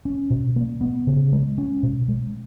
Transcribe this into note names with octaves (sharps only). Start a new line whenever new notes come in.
C#4
B2
A#3
B3
C#3
G#3
C#4
B2
G#3